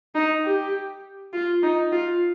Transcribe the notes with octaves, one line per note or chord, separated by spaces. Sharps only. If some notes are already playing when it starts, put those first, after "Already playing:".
D#4
G4
F4
D#4
F4